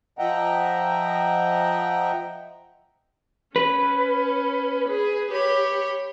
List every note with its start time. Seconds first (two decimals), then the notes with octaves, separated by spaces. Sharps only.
0.19 F3 D#5 E5 F#5 G5 A#5
3.56 C#4 B4
4.89 G#4
5.30 G4 C#5 B5